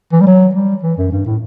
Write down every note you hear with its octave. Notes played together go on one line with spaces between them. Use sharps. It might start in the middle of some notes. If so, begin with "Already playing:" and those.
E3
G3
F#3
G3
E3
F#2
G2
A2